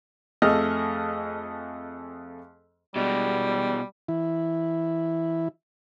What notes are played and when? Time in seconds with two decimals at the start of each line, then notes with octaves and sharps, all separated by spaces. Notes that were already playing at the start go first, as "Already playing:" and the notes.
0.42 F2 A3 G#4 D#5 F6
2.96 B2 G3 G#3
4.09 E3 E4